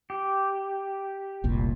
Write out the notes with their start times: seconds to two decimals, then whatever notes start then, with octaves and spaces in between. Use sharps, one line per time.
0.10 G4
1.44 F1 C2 A#2